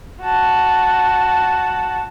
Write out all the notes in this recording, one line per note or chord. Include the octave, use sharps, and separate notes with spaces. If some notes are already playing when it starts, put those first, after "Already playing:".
F#4 A5